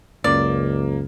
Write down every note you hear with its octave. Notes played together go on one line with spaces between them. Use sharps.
C#2 F#2 C#3 F#3 A#3 D5